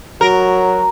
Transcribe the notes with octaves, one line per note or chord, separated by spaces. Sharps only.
F#3 F#4 A#4